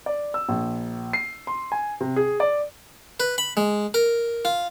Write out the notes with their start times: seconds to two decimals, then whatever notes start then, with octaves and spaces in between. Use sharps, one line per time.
0.06 D5
0.34 E6
0.49 A#1
1.13 C7
1.47 C6
1.72 G#5
2.00 C3
2.16 G#4
2.40 D5
3.20 B4
3.38 B5
3.57 G#3
3.94 A#4
4.45 F4